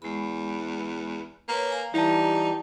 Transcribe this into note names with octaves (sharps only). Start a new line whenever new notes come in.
E2 G#3 B5
A#3 B4 C#5
F5 G#5 A#5
E3 G3 D#4 E4 G4 A5